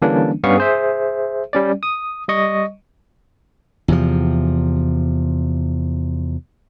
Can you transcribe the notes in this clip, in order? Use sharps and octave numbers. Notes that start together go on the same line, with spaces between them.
D3 E3 G3 A#3 C#4 D4
G2 G3 B3 C#4 F5 C#6
G#4 C5 E5
G3 C#4 D5
D#6
G3 D#5 C#6
E2 C3 F3